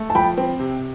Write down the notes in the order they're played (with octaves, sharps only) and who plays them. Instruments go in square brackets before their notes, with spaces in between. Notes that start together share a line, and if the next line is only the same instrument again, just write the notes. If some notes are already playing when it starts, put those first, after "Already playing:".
Already playing: [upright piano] A3
[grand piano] A5
[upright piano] F3 [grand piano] G5 B5
[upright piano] C4
C3